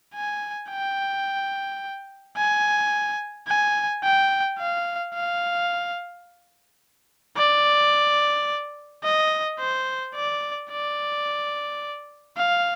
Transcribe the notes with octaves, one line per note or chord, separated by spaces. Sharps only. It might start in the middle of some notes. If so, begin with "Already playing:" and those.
G#5
G5
G#5
G#5
G5
F5
F5
D5
D#5
C5
D5
D5
F5